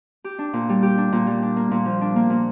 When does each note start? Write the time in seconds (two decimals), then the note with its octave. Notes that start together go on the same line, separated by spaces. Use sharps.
0.24 G4
0.39 D4
0.53 A#2
0.69 G3
0.83 G4
0.98 D4
1.12 A#2
1.27 G3
1.42 D4
1.57 A#3
1.71 A#2
1.85 F3
2.01 D4
2.16 A#3
2.30 A#2